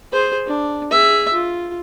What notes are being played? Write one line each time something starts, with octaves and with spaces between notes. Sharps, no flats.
G#4 C5
D4
G#4 E5
F4